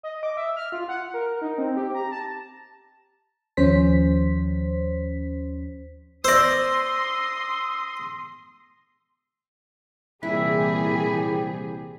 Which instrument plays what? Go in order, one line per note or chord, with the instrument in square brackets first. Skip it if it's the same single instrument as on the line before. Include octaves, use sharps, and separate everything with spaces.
[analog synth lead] D#5
D6
E5
F6
F4
F#5
A#4
D#4
C4
G4
A#5
A5
[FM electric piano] D#2 F3 C#4 C5 B6
[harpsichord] C5 D5 [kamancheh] C6 D#6 [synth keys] E6 A#6
[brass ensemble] C2 G4 [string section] A#2 E3 G#4 [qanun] E4 [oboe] B5